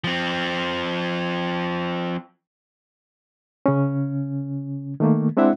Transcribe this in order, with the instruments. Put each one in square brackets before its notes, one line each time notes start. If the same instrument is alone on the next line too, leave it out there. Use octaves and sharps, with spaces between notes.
[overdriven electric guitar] F3 C4
[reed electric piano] C#3 C#4
D#3 A3 A#3
G#3 C4 D4 E4 E5 F#5